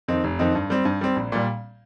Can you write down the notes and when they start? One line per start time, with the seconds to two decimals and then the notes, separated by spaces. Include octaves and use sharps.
0.08 F2 D#3 C4 D#4
0.24 F1
0.39 F2 D#3 C4 D#4
0.55 G2
0.70 G3 C4
0.85 G2
1.01 G3 C4
1.16 A#1
1.32 A#2 G3